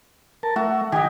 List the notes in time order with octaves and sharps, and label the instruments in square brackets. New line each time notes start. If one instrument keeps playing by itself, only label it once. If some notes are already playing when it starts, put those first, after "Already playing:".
[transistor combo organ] A#4 A5
[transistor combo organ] A3 E5 [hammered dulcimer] F#4
[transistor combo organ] D#3 G#5 [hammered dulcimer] G4 D#5